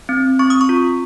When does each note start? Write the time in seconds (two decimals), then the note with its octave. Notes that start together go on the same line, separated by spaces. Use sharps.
0.09 C4
0.39 C4 C#6
0.50 D#6
0.61 C#6
0.69 F4